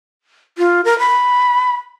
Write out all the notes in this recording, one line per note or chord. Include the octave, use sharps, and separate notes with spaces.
F4
A#4
B5